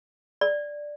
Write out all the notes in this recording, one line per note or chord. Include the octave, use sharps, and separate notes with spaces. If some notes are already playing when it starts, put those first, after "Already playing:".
D5